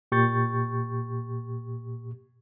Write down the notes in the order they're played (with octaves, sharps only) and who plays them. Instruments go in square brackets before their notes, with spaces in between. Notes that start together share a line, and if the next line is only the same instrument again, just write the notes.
[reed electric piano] A#2 G4 C#6 G6 A6